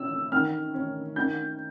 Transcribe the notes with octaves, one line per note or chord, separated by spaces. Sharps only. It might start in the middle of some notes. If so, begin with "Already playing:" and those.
Already playing: C#4 E6
D#3 F6
C#4
D#3 G6